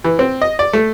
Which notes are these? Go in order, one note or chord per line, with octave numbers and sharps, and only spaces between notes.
E3
C4
D#5
D5
A3